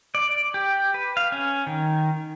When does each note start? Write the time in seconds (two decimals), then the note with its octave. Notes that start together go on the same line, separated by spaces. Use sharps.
0.15 D5
0.54 G4
0.94 B4
1.17 F5
1.32 C#4
1.67 D#3